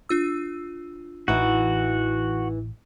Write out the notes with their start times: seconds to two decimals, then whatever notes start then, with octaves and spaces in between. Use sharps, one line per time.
0.09 D4 F4 E6
1.28 A1 E3 D#4 E4 F#4